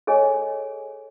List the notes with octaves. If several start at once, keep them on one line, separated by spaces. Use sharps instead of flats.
G#4 A4 C#5 D#5 G#5